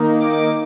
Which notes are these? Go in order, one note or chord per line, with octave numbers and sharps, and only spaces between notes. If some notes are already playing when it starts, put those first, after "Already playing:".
Already playing: D#3 A#3 D#4
D6